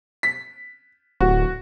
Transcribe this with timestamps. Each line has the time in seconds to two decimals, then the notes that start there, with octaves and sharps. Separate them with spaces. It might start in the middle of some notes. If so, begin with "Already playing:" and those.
0.23 B6
1.20 D1 F#4